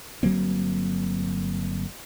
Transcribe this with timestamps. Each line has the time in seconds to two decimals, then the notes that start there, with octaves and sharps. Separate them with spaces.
0.23 G1 F#3 A#3 C4